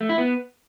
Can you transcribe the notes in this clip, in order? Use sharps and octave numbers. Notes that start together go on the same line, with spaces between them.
A3
E4
B3